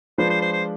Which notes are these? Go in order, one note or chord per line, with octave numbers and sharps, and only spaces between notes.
F3 G#3 D4 F4 B4 C5
C5
C5
C5